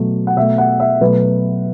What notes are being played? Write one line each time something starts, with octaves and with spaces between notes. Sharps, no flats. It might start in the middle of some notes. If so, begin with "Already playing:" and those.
Already playing: B2 F#3 A3
F#5
B2 A3 E5
F#5
E5
B2 F#3 A3 B4